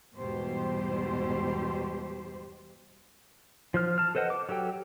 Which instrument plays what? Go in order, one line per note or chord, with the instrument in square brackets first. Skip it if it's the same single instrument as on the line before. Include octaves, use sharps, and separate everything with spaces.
[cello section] E2 G#2 B2 G3 G4 C5
[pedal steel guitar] F3 C5 F6
A5 F6
A4 B4 C5 D#5 F#5
D6
F#3 G4 A4 G5